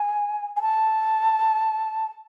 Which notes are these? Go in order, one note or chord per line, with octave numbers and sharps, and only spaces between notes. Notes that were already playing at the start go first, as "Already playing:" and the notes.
Already playing: G#5
G#5
A5